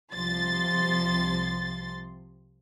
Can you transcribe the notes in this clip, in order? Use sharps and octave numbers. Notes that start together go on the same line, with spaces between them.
C2 C3 F3 C6 A6